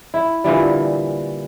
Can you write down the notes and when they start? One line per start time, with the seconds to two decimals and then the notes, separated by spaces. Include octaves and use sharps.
0.14 E4
0.44 A#2 D3 E3 G3